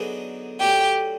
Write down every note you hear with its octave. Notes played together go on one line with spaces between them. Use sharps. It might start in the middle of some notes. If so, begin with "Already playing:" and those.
Already playing: D3 F#3 B3 D#4 G#4
D3 F#3 A3 G4 G5